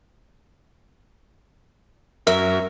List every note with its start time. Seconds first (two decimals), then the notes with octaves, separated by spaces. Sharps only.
2.27 F#2 A#4 E5